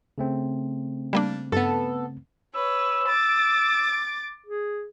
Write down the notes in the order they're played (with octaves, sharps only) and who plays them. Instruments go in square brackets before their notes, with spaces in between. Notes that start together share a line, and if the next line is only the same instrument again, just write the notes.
[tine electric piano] C#3 A3 C4
[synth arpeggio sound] G3 A#3 D4
[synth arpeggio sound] G2 [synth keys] B3 A4
[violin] B4 C#5 [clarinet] E6
[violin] D6 A6
[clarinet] G#4